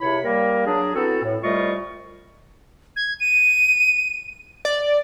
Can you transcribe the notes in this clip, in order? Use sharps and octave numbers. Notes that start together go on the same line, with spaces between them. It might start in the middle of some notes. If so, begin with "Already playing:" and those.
C#2 C3 E4 C#5 B5
G3 A#3 A#4
F#3 D4 G#4
B3 C4 E4 F#4 A4
A2
C2 G3 A3 F4 D#5 C#6
G#6
D#7
D5